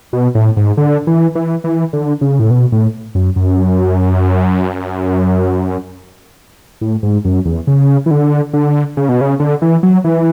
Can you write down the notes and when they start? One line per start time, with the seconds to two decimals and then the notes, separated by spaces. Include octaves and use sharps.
0.13 B2
0.35 A2
0.57 G#2
0.77 D3
1.07 E3
1.35 E3
1.64 E3
1.93 D3
2.21 C#3
2.39 A2
2.51 B2
2.72 A2
3.15 F#2
3.36 F#2
6.81 A2
7.03 G#2
7.25 F#2
7.45 E2
7.67 C#3
8.06 E3
8.11 D3
8.53 D3
8.97 C#3
9.09 B2
9.21 C#3
9.40 D3
9.62 E3
9.83 F#3
10.04 E3